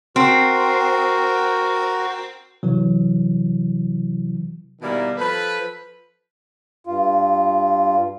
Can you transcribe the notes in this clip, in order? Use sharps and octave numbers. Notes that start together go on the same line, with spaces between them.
C4 F#4 A#4
C3 E3 F#3
B2 D#3 G3 A#3 E4
F3 A4 B4
G2 F4